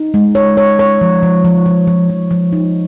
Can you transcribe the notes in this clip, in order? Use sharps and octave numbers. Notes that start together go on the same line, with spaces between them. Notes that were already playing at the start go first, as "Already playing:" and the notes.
Already playing: D#4
G#3
C#5
C#5
C#5
F3
F3
F3
F3
F3
F3
F3
D#4